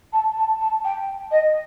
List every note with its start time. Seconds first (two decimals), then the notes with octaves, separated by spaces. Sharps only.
0.12 A5
0.37 A5
0.60 A5
0.84 G5
1.31 D#5